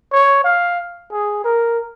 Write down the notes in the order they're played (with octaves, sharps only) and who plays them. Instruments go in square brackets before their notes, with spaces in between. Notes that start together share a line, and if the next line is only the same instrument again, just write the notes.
[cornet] C#5
F5
G#4
A#4